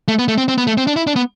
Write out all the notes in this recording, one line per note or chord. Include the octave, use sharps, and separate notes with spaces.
A3
B3
A3
C4
C4
B3
A3
C4
D4
E4
D4
B3